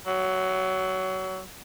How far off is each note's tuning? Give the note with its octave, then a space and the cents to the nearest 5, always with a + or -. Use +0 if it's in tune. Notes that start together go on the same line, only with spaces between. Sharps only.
F#3 +20